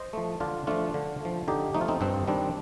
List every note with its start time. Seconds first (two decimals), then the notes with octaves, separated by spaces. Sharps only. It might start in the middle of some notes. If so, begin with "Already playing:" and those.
Already playing: C5 D#5
0.13 F3 A3
0.40 D3 D4 F4
0.67 F3 A3 D4 F4
0.94 D3
1.21 F3 A3
1.48 D3 D#4 G4
1.74 F3 A3 D#4
1.81 F4
1.88 C4 D#4
2.01 G2 C4
2.28 D#3 G3 C4 D4